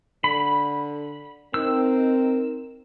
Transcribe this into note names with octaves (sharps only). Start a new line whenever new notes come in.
D3 B5
C4 D#4 A#4 E6